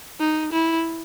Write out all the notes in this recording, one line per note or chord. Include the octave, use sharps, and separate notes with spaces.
D#4
E4